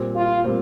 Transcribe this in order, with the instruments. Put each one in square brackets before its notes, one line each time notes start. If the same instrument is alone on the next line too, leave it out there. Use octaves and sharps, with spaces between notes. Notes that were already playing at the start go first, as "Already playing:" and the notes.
Already playing: [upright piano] A#2 G3 C4
[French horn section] F4
[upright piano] A#2 G3 C4